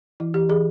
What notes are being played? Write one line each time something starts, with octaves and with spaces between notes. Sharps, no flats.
E3 E4
E3 G4
E3 G#4